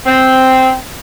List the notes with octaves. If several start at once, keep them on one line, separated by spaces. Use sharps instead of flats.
C4